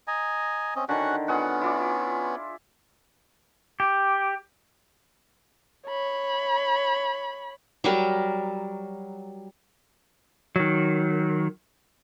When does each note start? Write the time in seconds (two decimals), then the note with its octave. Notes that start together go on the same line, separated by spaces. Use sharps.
0.08 D#5 G#5 A#5
0.76 C4 C#4 D#5
0.89 D3 D#3 C#4 F#4 F#5
1.28 B3 C#4 F4 G#4 F#5
1.61 E4 F4 D5
3.80 G4
5.87 C#5 B5
7.84 F#3 G3 A#4
10.56 D#3 F#3